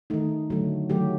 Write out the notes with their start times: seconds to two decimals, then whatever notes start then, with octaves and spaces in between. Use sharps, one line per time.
0.10 D#3 A3 D#4
0.50 D3 F#3 A3
0.90 D#3 F#3 A3 G4